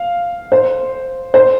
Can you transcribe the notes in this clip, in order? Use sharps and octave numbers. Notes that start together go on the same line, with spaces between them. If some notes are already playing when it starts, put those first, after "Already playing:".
Already playing: F5
C5
C5